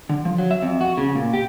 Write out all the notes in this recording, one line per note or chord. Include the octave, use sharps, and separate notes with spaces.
D3
F3
F#3
E5
F2
F#4
C#3
A#2
G4